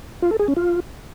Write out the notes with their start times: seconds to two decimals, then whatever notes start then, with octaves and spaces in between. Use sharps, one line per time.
0.22 F4
0.31 A4
0.39 G#4
0.48 C#4
0.56 F4